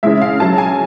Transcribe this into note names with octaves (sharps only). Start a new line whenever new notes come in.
C#3 E3 G#3 E5
F5
C#3 F#3 A5
G#5